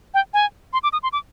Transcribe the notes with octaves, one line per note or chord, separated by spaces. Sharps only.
G5
G#5
C6
D6
D#6
C6
D6